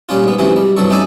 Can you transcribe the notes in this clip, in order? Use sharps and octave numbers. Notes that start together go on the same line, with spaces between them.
A#2 G3 C#4 F4
G#2 B3
G#2 C3 E3 F#3 C#4
G3
C2 G2 F#3 A4 C#6
A3 C#4 D#4 D5 E5 G#5